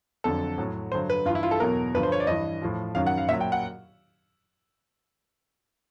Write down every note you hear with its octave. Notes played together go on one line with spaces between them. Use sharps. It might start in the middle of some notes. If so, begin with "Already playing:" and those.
F2 D3 F#3 A4
A2 F#3
G2 D3 F#3 C5
B4
G2 E3 F4
E4
F4
A4
E2 B2 F#3 A#4
G2 D3 F3 B4
C5
C#5
D5
G2 E3 D#5
A2 F3
F#2 D#3 F#3 F5
F#5
F5
A#2 F#3 E5
G5
F#5